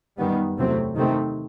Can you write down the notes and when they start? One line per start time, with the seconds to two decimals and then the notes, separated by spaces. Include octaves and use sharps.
0.18 F#2 D#3 G3 B3
0.57 E2 C3 F#3 A3 C4
0.95 C3 D#3 A3 C4